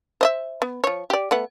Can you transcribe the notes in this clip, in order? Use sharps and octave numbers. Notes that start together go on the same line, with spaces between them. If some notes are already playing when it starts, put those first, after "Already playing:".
C5 D#5 E5
B3
F3 C#5
G4 D5
A3 B3 F#5